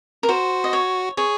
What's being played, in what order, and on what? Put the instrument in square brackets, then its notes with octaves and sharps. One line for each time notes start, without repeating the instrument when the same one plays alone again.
[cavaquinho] A#4
[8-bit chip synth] F#4 [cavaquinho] C5
[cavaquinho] D#5
C#5
[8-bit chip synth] G#4 [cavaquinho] C#5